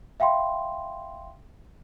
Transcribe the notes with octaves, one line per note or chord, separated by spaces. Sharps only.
E5 F5 G5 B5 C6